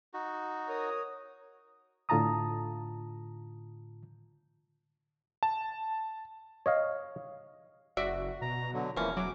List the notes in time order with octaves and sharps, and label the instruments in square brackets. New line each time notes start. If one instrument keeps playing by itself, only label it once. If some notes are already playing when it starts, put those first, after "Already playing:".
[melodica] D#4 F#4
[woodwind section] A#4 C#5 D#6
[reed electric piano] A2 D3 F4 A5 A#5 D#6
[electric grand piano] A5
[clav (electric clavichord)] C#5 D#5 F5
[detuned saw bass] F#1 [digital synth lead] F#4 [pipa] D5 E5
[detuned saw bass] B2 [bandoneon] A#5
[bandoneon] D3 F#3
[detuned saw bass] E1 [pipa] C#3 C#4 [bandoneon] E3 F3 A#3
[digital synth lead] F#3 [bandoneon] D6